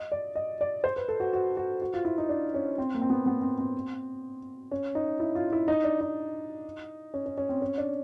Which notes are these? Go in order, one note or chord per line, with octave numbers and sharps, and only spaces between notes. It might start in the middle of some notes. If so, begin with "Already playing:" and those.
Already playing: D#5
D5
D#5
D5
C5
B4
A4
F#4
F#4
F#4
F#4
F4
E4
D#4
D4
C#4
C4
A#3
C4
B3
B3
C4
C4
C#4
D#4
E4
F4
E4
D#4
D4
D#4
C#4
C#4
C#4
C4
C#4
D4